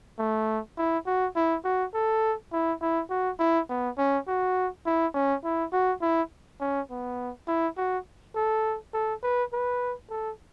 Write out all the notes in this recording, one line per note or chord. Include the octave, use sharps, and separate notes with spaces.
A3
E4
F#4
E4
F#4
A4
E4
E4
F#4
E4
B3
C#4
F#4
E4
C#4
E4
F#4
E4
C#4
B3
E4
F#4
A4
A4
B4
B4
A4